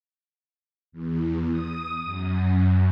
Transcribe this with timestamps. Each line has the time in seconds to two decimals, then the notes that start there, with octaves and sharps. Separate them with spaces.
0.92 E2
1.50 D#6
2.04 F#2